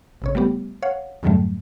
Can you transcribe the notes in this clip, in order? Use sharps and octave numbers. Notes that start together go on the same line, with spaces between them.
A1 C#3 C#5
G3 A3 B3 G4
C#5 F5 F#5
F2 G#2 D3 F#3 G3 A3